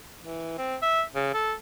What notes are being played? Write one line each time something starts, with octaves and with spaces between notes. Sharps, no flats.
E3
C4
E5
C#3
A4